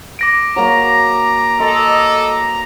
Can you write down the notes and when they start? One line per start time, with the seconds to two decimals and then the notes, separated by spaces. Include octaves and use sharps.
0.19 D6 A#6 D7
0.56 F#3 A#3 A#5
1.59 A4 D#5 C6